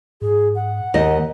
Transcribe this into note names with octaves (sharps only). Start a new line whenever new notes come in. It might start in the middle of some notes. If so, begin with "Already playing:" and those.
G#2 G#4
F#5
D#2 D#3 D#5